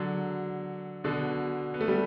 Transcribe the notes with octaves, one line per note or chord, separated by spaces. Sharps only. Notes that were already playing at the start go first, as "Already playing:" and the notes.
Already playing: D3 F#3
B2 D3
B3
A3
G3